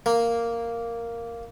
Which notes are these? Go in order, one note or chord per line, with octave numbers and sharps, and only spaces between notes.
A#3